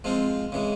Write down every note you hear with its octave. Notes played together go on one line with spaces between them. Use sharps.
F3 G#3 C4 F4
C#3 E3 G#3